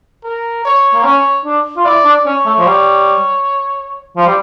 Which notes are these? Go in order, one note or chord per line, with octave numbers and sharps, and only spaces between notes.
A#4
C#5
A#3
C#4 C#5
D4
F4
E4 D5
D4
C#4 C#5
A3
F3
G3
F3
G3